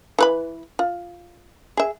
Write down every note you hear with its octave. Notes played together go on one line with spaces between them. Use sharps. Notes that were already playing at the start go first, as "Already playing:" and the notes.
E3 B4 B5
F4
G#4 E5